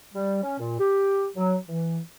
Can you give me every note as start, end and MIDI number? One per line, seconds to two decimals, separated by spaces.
0.14 0.42 55
0.43 0.57 61
0.59 0.76 46
0.79 1.27 67
1.35 1.56 54
1.68 1.99 52